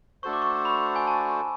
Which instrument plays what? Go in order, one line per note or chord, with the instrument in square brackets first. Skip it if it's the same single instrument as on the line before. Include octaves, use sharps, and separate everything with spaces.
[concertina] A3 D4 F#4 A4 C5 [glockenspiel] C#6
[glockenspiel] D6
C#6
B5
G#5
A5